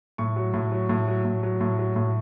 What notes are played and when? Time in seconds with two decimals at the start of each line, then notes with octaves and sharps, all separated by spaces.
0.18 A2 C#6
0.36 F#3
0.54 A2
0.72 F#3
0.89 A2
1.07 F#3
1.25 A2
1.43 F#3
1.61 A2
1.79 F#3
1.96 A2